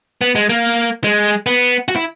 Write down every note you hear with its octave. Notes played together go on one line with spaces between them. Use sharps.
B3
G#3
A#3
G#3
B3
F#4
E4